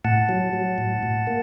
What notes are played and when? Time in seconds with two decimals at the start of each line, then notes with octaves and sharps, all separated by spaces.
0.04 A2 F#5 A5
0.29 F#3
0.53 F#3
0.78 A2
1.03 A2
1.27 A#3